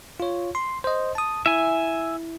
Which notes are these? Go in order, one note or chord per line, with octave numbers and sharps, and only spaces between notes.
F4 C#5
C6
C5 D#5
A5 D#6
E4 E5 G#5